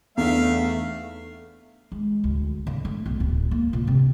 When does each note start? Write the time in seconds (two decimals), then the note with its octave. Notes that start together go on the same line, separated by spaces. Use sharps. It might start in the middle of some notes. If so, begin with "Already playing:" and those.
0.17 E2 A3 B3 D4 D#4 E5 F5
1.92 G#3
2.24 D2
2.67 D3
2.85 A3
3.06 B1
3.20 D1
3.51 A#3
3.73 A#2
3.87 C3